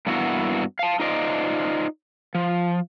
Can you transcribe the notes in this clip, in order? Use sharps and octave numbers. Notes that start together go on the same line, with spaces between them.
G2 A#3 B3 E4 F#4
F5 A5
D#4 F4 C5 D5 D#5
F3